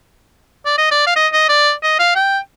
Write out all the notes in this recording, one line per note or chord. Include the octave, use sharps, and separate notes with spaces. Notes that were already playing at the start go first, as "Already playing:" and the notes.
D5
D#5
D5
F5
D#5
D#5
D5
D#5
F5
G5